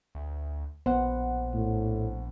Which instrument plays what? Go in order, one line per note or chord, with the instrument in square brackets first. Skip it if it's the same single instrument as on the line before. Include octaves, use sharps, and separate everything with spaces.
[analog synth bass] D2
[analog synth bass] A#1 [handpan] B3 [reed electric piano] C5 F#5
[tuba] A2